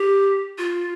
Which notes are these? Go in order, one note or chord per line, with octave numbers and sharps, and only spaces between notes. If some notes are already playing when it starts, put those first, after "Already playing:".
Already playing: G4
F4